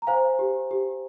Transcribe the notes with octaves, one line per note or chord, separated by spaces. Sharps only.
A#5
C5 F5 G#5
G4
G4